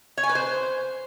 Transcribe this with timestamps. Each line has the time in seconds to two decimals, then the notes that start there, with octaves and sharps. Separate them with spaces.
0.17 C#5
0.23 G#5
0.29 B4
0.35 C5